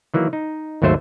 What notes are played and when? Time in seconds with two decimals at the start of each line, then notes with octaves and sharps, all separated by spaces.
0.14 D#3 E3 F#3 A#3
0.33 D#4
0.82 G#1 D#2 F#3 A3 C5 E5